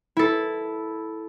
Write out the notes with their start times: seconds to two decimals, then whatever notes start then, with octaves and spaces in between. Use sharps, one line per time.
0.17 E4 A4